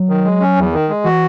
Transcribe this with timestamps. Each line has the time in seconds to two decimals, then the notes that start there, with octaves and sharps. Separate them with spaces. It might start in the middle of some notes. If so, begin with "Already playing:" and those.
Already playing: F#3
0.09 D#3
0.24 G#3
0.40 C#4
0.56 E2
0.73 D#3
0.89 G#3
1.04 E3 F#4